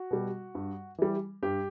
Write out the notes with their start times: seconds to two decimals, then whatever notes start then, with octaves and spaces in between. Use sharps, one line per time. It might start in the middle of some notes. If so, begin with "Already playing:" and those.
Already playing: F#4
0.11 B2 G3
0.55 G2
0.98 E3 G3
1.43 G2 G4